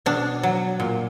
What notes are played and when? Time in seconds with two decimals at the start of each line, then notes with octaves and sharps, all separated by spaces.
0.06 B2 D4
0.43 F#3
0.80 A#2